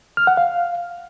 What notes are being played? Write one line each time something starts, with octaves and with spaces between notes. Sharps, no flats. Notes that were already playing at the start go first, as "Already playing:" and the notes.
F6
F#5
F5